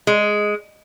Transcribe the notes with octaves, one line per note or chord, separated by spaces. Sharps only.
G#3